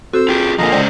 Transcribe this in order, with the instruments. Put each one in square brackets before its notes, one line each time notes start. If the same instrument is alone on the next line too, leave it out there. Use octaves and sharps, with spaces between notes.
[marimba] C4 F#4 A4 [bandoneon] C5 E6
[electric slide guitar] F4 G#4 [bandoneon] G5
[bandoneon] A#2 D3 D#5 [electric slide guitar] F3 G#3 A#3 [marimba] G#5 A#5
[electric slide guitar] C#3 C#4 C5 [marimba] G#3 D5 G5